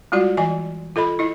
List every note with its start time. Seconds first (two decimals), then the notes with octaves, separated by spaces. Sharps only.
0.12 G3 G#3 F4 F#4 D5
0.37 E3 D#5 G#5
0.96 F4 A4 D#5 B5
1.19 E4 D#5